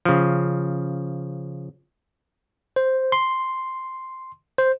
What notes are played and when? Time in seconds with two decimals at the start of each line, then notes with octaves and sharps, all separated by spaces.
0.05 C#3 F3
2.76 C5
3.12 C6
4.58 C5